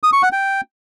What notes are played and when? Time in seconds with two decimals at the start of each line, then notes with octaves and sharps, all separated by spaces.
0.03 D#6
0.13 C#6
0.23 F#5
0.32 G5